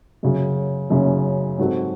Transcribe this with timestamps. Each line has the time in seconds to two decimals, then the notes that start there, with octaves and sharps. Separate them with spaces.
0.23 F#2 C#3 F#3
0.90 F#2 C#3 F#3
1.58 G#2 F#3 C4 F#4 A4